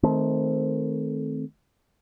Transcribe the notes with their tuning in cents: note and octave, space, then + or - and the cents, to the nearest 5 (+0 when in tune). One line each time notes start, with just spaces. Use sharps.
D#3 +0 A3 -20 C4 +0